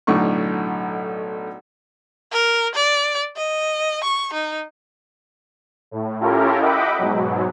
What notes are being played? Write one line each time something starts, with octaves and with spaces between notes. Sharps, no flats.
B1 A2 D3 A3 D#4 C#6
A#4
D5
D#5
C#6
D#4
A2
C#4 E4 F4 G4 A4 A#4
D#5 E5 F#5 G5 B5 D6
G#2 B2 F#3